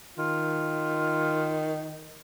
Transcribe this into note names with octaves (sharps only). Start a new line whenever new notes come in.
D#3 F4